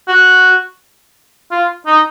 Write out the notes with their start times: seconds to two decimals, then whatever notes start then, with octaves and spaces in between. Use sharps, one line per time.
0.08 F#4
1.51 F4
1.87 D#4